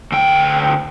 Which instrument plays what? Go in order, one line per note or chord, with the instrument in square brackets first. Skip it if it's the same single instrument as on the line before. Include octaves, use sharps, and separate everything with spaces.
[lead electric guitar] D2 G5